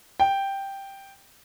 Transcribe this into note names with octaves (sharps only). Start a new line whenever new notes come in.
G5